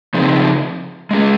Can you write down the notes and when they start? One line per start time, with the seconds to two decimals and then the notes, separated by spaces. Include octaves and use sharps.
0.14 C#3 F3 C4 D#4 G#4
1.11 G#3 C#4 G#4